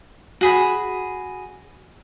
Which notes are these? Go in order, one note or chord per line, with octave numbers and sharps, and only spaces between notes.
F#4 G#4 B5